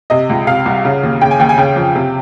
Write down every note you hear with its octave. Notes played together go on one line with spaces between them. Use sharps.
C3 D#5
C#2
C3 F5
C2
C#3
D#2
C#3 G5
G#5
D#2 G5
G#5
C#3 G5
F2
C3